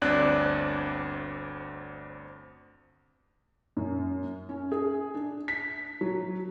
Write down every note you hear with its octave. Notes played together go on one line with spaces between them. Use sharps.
G1 D2 C4 D4 D5 F#6
F#2
C#4
G#4
D4
B6
F#3